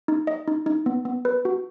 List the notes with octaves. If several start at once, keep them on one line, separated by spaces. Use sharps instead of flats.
D#4
D#5
D#4
D#4
B3
B3
B4
F#4